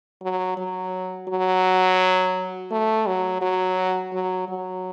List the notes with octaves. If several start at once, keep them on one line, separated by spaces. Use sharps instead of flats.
F#3
F#3
F#3
A3
F#3
F#3
F#3
F#3